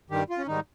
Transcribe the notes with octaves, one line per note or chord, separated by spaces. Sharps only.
G2 D#3 G3 G4
F4
C#4
G#2 D#3 G3 D#4